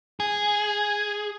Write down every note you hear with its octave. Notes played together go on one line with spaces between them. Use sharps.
G#4